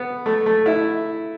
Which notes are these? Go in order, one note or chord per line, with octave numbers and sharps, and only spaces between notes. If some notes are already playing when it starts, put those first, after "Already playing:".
Already playing: B3
A3
A3
E4